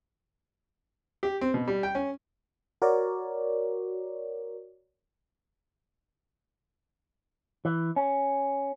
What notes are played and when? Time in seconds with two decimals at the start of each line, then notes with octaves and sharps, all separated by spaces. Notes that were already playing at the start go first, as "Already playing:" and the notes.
1.23 G4
1.41 C4
1.54 B2
1.68 G3
1.83 G5
1.95 C#4
2.82 F#4 A#4 C#5 D5
7.65 E3
7.96 C#4